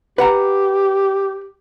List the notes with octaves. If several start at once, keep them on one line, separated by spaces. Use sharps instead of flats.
G4 B4 F#5 A#5